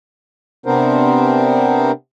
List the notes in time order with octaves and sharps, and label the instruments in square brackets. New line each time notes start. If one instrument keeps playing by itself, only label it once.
[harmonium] C3 B3 C4 D4 A#4 C5